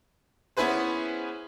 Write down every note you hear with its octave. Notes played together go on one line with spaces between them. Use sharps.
B3 C#4 E4 G#4 B4 C5